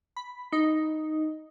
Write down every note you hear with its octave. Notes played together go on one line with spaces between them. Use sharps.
B5
D#4